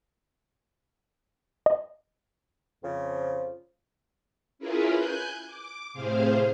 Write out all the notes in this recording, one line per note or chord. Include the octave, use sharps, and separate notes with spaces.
D#5
F2 C#3 F3
C#4 E4 F4 G#4 A#4 B4
G#5 F#6 G6
D6
A2 C3 G#4 C5 F5